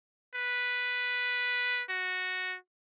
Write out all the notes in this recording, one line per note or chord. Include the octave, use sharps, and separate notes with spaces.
B4
F#4